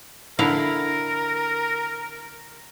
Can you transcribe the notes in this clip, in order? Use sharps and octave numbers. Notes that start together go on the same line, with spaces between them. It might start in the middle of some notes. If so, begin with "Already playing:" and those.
D3 E4 A#4 F5